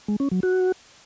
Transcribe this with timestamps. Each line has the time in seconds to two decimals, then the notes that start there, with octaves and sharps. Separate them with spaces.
0.08 G#3
0.20 C#4
0.31 F#3
0.43 F#4